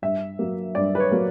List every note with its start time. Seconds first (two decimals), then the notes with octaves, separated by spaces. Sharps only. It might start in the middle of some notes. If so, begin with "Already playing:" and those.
0.02 G2 E5
0.39 F#3 A#3
0.75 G2 D5
0.95 B4
1.00 C#5
1.11 F#3 A#3